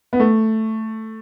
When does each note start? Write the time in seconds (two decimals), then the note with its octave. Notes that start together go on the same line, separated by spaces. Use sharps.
0.13 B3
0.20 A3